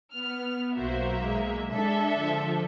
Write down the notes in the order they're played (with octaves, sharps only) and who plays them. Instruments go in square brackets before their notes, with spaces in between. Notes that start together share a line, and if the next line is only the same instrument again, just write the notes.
[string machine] B3 [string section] F6
[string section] B1 A#3 E5 [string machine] F#4 C5
[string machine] G#3
[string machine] G#3 [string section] D4 A4 E5
[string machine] D3 F3